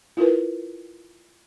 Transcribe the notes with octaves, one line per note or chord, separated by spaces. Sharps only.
E4 F4 A#4 B4